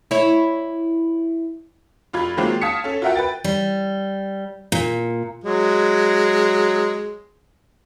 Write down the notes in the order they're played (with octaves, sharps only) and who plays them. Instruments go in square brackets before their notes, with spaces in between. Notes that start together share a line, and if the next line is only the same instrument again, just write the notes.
[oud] E4 C#5
[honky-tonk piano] F1 F4 B5 G#6
D#3 F#3 G#3 A#3 C4 F4
F5 A5 D#6 G#6 B6 C#7
C#4 A4
F4 F#4 A#4 E5 F#5 G5
B4 G5 A6
[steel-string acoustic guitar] G3
A#2
[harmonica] F#3 G#3